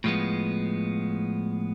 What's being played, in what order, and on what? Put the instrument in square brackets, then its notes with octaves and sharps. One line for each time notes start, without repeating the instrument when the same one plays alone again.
[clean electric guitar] A2 F3 G#3 B3